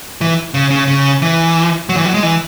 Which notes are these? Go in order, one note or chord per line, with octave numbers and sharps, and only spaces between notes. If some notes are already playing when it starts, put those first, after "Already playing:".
E3
C#3
C#3
C#3
E3
F#3
E3
F#3
G#3
E3